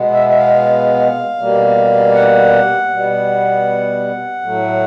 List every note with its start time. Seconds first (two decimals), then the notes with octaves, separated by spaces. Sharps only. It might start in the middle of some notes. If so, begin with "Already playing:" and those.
Already playing: B2 G#3 B3
0.12 E5
0.29 E5
0.37 F5
1.38 B2 G3 A#3
2.14 F#5
2.90 B2 G3 B3
4.42 A2 F#3 A3